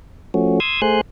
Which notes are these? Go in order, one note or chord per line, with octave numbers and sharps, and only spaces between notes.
F3 A3 C#4 F#4
C6 D#6 E6 G#6
A3 G#4 C5 G#5 C6 F#6